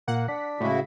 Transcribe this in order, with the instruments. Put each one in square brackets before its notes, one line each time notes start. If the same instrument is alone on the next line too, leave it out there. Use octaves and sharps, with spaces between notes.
[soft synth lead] A#2 [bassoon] A#3 [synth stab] F#5
[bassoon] D4 [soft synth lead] B6
[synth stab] A2 G#3 [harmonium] C#3 E4 F#4